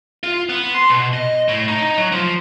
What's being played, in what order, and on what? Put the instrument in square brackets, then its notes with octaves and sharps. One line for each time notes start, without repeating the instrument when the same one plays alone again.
[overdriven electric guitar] F4
B3
C6
B2
D#5
A2
D#4
F#3
F3